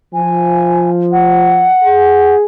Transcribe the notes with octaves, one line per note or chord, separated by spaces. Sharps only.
F3 G#5
F#5
G#4